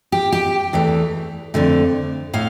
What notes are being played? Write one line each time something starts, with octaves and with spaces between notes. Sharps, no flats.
G4
G4
E2 E3 A3
F2 D3 A3
A2 F5